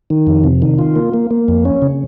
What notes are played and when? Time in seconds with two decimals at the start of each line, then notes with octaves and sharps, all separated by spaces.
0.10 D#3
0.27 F2
0.44 C3
0.62 D#3
0.79 F4
0.96 A#3
1.14 A#3
1.31 A#3
1.48 F2
1.65 C#4
1.82 C#3